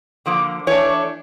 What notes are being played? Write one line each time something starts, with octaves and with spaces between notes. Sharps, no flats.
D3 F3 A#3
E3 A3 D4 C#5